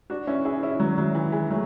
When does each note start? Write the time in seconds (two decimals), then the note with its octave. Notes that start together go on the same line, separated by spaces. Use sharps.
0.10 D4 F#4
0.27 C#4 E4
0.45 E4 G#4
0.62 C#4 E4
0.80 F#3
0.98 F#3
1.15 E3
1.32 E3 G#3
1.50 F#3 A3